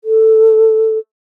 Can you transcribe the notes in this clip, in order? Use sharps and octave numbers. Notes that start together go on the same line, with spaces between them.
A4